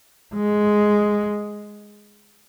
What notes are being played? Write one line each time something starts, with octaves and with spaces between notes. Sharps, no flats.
G#3